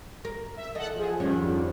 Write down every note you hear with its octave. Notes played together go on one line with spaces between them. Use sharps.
A#4
E5
E2 A4 D#5 F#5
F3 G#4
F2 D3 D#3 F3 G3 C#4